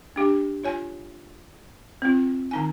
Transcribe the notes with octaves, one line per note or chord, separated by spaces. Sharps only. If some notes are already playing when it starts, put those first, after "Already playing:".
D4 G4
F4 C#5 G#5
C4 F4
D#3 D#4 G#5